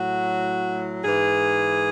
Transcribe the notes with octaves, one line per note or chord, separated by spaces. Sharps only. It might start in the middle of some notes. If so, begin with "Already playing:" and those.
Already playing: A2 F#3 F#4
G#2 E3 G#4